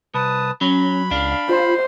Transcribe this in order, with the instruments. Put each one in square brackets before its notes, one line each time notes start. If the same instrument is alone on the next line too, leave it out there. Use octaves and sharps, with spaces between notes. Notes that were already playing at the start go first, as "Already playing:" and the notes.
[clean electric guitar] C2 [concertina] B4 A5 D#6
[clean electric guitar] F#3 [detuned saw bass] C#4 [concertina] B5
[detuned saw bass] C#2 [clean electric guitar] D4 [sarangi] F5
[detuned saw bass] F4 [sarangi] C5